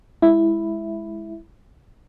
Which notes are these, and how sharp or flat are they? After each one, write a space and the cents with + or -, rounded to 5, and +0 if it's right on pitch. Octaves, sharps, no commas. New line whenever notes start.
G#3 +0 E4 +0